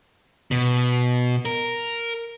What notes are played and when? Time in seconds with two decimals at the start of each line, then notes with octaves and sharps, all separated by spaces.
0.51 B2
1.45 A#4